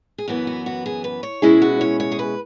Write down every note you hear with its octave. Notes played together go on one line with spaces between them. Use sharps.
G#4
F#2 E3 B3 F#4
F#4
F#4
G#4
B4
C#5
B2 G#3 C#4 E4 G#4
F#4
C#5
C#5
G#4
B4